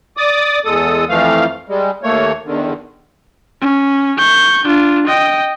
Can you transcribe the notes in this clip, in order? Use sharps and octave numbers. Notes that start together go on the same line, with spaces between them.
D5 D6 D#6
E2 G#3 A4 D#6
F2 E3 F3 A3 F5
G3 G#3
D#2 A3 A#3 C#5
E2 D3 D#3
C#4
C#6 G6
D4 F4
D#5 G5